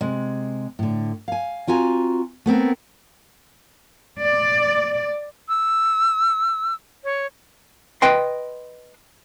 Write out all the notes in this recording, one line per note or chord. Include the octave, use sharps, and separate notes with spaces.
C3 G#3
A2 D3
F5 G#5
C4 F4 F#4 G#5 A#5
A3 B3 C4 A#4
D5
E6
C#5
B4 D#5 G5 C6